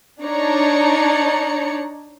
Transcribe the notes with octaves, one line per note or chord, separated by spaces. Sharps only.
D4 D#4 C#5 D5 A#5 C#7